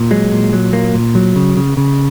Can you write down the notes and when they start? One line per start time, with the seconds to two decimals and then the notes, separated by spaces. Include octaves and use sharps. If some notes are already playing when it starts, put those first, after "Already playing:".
Already playing: A#2
0.11 F#3 G#3
0.32 A#2
0.53 F#3
0.73 A#2 A#3
0.94 A#2
1.15 F#3
1.36 C#3
1.57 C#3
1.77 C#3